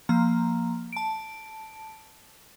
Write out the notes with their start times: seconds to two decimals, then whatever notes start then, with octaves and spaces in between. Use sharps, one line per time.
0.09 F3 A#3 A#5
0.93 A5 D7